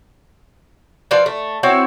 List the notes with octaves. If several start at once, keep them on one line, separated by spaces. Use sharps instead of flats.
F3 F4 B4 D5
A3
C4 E4 F#4 C#5